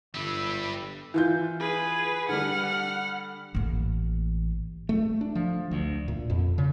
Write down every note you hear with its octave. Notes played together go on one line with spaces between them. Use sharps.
G1 G3 B4 E5
E3 F4 G6
G#4 B4
D3 G3 F#5 F6
A1 A#3
A3
D4
F3
D2
A#2
F2
C#3